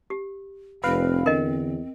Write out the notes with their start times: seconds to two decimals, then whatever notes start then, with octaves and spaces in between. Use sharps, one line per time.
0.10 G4
0.84 F1 C4 B4 F5
1.26 E2 D3 A#4 D#5